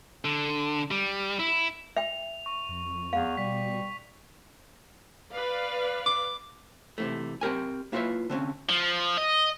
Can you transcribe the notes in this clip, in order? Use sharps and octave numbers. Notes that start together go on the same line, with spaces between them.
D3
G3
E4
E5 G5 F7
C#6
F2
E2 F5
B2 G3 B6
B4 D5 F5
D6
C3 E3 A3
C4 G4 A#4 G#5
A#3 E4 F4 B4 C#5 E5
D3 C4 C#4
F3
D#5